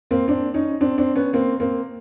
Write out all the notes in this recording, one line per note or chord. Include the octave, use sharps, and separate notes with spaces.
A#3 C4
C4 D4
C#4 D#4
C4 D4
C4 D4
B3 C#4
A#3 C4
A#3 C4